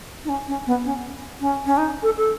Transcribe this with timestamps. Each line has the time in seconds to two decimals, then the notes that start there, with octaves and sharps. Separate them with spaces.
0.25 D#4
0.29 C#4
0.48 C#4
0.67 B3
0.85 C#4
1.41 C#4
1.66 C#4
1.78 D#4
2.03 A4
2.17 A4